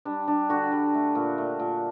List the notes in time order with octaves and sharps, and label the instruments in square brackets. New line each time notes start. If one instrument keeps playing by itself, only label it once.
[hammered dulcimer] G3 D4
G3 D4
D3 F#4
G3
A3
A#2
A3
A#2